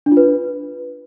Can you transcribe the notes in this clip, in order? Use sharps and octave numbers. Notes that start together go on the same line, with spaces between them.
D4
F4
B4